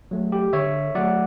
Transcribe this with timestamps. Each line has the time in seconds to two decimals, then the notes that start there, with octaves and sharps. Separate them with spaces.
0.11 F#3 A3
0.32 G4
0.53 D3 C#5 E5
0.95 F#3 A3 D5 F#5